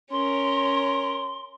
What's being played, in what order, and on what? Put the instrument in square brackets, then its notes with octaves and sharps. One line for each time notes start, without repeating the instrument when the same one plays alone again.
[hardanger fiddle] C#4 A#4 [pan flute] C6